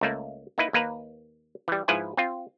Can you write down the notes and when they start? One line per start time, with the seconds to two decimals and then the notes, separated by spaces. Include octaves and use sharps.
0.01 C#2 A3 A#3
0.58 A#3 D#4 E4 B4
0.73 D#2 A#3 B4 A#5
1.68 E3 G3
1.88 G#2 F3 E4 B4 G#5
2.17 C4 F4